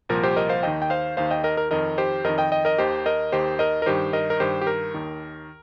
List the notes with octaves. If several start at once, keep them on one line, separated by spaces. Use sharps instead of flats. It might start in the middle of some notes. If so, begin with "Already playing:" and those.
C2 A#2 F3 A#4
G4 C5
A#4 D#5
C5 F5
D#2 D#3 D#5 G5
G5
C5 F5
D#2 D#3 C5 F5
D#5 G5
A#4 D#5
A#4
F2 D#3 A#4 D#5
G4 C5
F2 D#3 A#4 D#5
D#5 G5
D#5 G5
A#4 D#5
D#2 D#3 G4 C5
A#4 D#5
D#2 D#3 G4 C5
A#4 D#5
A#4
G2 D#3 G4 C5
A#4 D#5
A#4
G2 D#3 G4 C5
G4
A#4
D#2 D#3